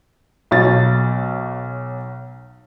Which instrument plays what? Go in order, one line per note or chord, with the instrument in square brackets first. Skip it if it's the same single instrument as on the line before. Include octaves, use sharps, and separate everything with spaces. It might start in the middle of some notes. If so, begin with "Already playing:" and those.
[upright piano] B1 F#3 A6